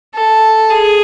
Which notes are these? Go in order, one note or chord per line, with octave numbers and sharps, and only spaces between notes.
A4
G#4